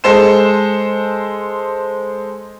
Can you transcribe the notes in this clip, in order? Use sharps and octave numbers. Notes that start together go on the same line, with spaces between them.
G#3 A4 C5 C6 E7